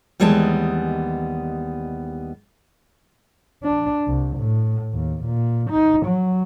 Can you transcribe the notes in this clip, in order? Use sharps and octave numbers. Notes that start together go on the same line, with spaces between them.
D#2 E3 G3 G#3 B3 A5
D4
C2
A2
D#2
A#2
D#4
F#3